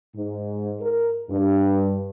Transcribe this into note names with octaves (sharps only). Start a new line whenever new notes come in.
G#2
A#4
G2